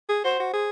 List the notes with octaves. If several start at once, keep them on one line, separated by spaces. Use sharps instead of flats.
G#4
F#4 C5
F#4
G#4